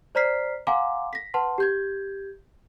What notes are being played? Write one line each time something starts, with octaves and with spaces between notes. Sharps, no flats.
C5 D5 A#5 F6 B6 C7
F5 F#5 G#5 A#5 C6 D6
A#6 B6
B4 F#5 A5 C6
G4 G6 G#6